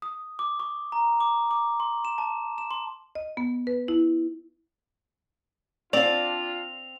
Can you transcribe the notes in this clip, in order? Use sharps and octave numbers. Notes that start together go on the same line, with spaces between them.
D#6
D6
C#6
A#5
D6
D6
C6
E7
A5
E7
C6
D#5
B3
B4
E4
C4 D4 F4 D5 F5 F7